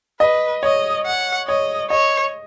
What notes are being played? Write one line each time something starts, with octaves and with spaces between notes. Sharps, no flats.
B4 D#5
C#5 D#5
F#5
C#5 D#5
C#5 D#5